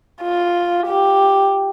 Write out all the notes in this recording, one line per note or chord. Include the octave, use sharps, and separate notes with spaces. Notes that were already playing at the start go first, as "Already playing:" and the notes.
F4
G4